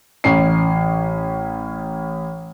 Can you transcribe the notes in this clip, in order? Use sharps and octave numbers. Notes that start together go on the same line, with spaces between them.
A1 C#4 C7